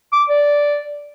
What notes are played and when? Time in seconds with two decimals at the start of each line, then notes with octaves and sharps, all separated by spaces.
0.13 D6
0.29 D5